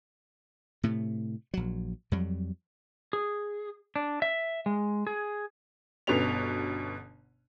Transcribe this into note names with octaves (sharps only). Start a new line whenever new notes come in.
A2 C3 A3
A#1 F#3
F2 F#3 G3
G#4
D4
E5
G#3
G#4
G1 B2 D3 B3 C#4 F7